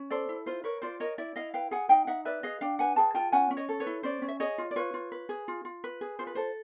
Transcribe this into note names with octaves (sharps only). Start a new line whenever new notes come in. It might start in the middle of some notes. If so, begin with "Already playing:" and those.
Already playing: C#4
A4 C5 D5
E4
F4 C5
A#4 B4 C#5
F4 C5 D5
A#4 C#5 D#5
E4 D5 E5
E4 D#5 F5
B4 F5 G5
G#4 F#5 G#5
D#4 F5 G5
D#4 E5 F#5
B4 D5 E5
G#4 D#5 F5
D4 F5 G5
B4 F#5 G#5
G#4 G5 A5
F4 G5 A5
C#4 F#5 G#5
C#4
C#5 D#5
A4
B4 C#5
E4
C#4 C5 D5
C#4
E5
G#4 C#5 D#5
F4
D5
F4 B4 C#5
F4
B4
G#4
F4
F4
B4
G#4
F4 C5
B4
A4 C5